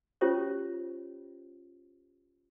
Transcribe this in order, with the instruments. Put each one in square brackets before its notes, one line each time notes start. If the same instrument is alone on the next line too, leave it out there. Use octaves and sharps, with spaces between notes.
[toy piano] C#4 F4 G4 C5 C#5